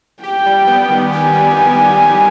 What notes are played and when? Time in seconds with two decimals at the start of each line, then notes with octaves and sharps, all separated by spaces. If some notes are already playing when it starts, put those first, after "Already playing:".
0.23 G4 G5
0.46 G3
0.67 B3
0.90 D#3
1.13 G4 G#5
1.35 G3
1.57 B3
1.79 D#3
2.01 G4